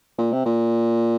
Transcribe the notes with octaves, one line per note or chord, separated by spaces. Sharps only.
A#2
C3
A#2